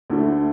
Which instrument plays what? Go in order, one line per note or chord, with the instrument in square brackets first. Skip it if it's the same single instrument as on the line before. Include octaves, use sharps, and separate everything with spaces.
[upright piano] D2 D3 A3 E4